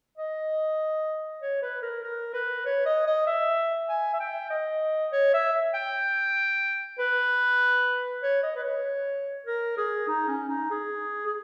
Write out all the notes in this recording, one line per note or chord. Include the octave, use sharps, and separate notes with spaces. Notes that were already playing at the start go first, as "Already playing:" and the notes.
D#5
C#5
B4
A#4
A#4
B4
C#5
D#5
D#5
E5
G#5
E5
G5
D#5
C#5
E5
G5
B4
C#5
D#5
B4
C#5
A#4
G#4
D#4
C#4
D#4
G#4
G#4